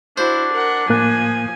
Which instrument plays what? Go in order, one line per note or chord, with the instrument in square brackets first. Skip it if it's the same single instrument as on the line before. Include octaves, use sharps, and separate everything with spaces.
[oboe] D4 [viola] E4 F#4 [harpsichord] C5
[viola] A#4 F#5
[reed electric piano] A2 A#3 F#6 [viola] F3 G#5